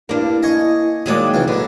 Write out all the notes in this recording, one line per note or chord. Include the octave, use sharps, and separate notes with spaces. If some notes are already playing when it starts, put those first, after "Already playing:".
G2 A#3 D4 E4
D#5 G#5 C#6
D#3 F#3 G#3 A#3 G#4 D5
C2 E3 F4 F#4
B2 D3 F#3